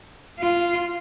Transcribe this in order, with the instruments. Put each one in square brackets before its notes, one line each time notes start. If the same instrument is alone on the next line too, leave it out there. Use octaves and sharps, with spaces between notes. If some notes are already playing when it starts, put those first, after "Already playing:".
[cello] F4